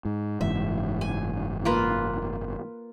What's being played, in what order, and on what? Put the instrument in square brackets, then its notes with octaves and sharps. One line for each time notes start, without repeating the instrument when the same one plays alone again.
[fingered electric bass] G#2
[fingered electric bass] F#1 G#2 E3 [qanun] E5
[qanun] G#5
A#3 F4 B4